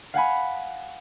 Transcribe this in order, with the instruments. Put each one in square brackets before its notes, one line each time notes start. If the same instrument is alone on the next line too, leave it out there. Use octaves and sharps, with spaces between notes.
[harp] F5 F#5 G#5 B5